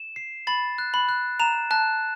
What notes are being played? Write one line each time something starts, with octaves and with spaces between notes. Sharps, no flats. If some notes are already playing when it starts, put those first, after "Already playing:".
Already playing: E7
C7
B5 A6
F#6
B5
F#6
A#5 E7
A5 F#6